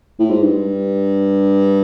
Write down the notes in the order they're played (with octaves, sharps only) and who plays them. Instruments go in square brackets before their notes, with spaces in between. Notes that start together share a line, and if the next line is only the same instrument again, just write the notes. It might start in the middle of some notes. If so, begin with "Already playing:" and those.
[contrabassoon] A2
G#2
G2